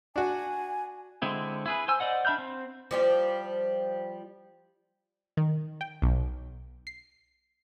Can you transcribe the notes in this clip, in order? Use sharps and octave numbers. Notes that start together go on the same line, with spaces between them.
D4 F#4 G#5
D3 G#3 C4 E4
E4 G#4 B4
C5 G#5 E6
C5 D5 D#5 F#5
D4 E5 B5 F6 G6
C4
F3 G3 G4
D#3
G5
B1
C7